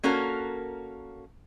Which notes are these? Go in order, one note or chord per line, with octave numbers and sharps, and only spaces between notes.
A#3 C#4 F#4 A4 A#4